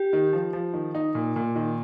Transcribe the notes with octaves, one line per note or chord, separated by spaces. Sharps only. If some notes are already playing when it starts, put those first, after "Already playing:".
Already playing: G4
D#3
F3
F3
D#3
D#4
A#2
A#2
D#3